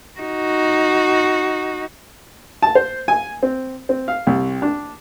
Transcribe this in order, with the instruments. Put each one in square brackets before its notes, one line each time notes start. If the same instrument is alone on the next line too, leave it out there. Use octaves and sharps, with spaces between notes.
[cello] D#4 F#4
[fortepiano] A5
C5
G#5
C4
C4
F5
C2
D4